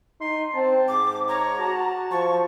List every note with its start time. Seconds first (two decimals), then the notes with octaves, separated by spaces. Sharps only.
0.21 D#4 C6
0.54 C4 A5
0.88 G#2 D6
1.29 C#5 A#5
1.59 F#4 A5
2.11 F3 C#6